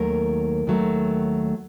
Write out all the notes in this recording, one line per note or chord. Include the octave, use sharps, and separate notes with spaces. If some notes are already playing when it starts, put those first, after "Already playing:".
Already playing: D#2 D#3 F#3 A3 A#4
D#2 D#3 F#3 A3